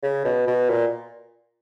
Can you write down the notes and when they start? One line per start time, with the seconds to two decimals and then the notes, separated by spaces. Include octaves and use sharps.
0.03 C#3
0.25 B2
0.47 B2
0.70 A#2